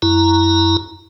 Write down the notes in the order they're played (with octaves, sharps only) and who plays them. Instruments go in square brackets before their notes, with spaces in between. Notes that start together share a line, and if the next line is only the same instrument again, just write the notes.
[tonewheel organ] F#2 E4 A#5